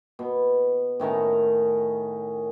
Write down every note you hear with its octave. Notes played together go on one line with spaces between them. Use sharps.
B2
A2 D#3 C#4 A#5